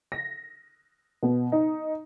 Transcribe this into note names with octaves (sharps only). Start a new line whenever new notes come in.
A#6
B2
D#4